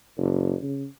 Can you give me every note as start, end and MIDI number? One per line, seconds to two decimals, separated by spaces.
0.18 0.55 30
0.62 0.86 49